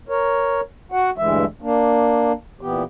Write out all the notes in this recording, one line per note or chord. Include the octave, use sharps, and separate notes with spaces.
A#4 C#5
F#4 F#5
D2 G2 E3 G#3 E5
A#3 D4
A#2 E3 B3 G4